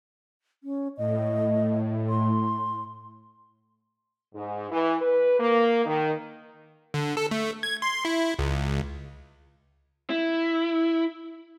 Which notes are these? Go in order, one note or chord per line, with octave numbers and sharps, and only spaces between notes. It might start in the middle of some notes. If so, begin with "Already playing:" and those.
C#4
A2 D#5
C6
G#2
E3
B4
A#3
D#3
D3
A4
A3
G#6
C6
E4
C#2
E4